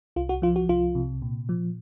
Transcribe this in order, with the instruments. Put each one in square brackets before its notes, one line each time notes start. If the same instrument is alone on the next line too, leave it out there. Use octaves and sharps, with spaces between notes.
[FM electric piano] C2 F4
F#4
F3 F4
F#4
C2 F4
C3
A#2
F3